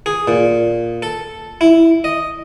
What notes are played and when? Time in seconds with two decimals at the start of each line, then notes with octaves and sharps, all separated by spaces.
0.06 G#4
0.28 A#2
1.02 A4
1.61 E4
2.04 D#5